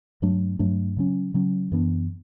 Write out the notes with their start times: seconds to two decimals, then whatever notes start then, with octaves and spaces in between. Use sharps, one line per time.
0.22 G2 F#3 A3 D4
0.59 G2 F#3 A3 D4
0.97 C#3 F#3 C#4
1.34 C#3 F#3 C#4
1.72 F#2 E3 B3 D4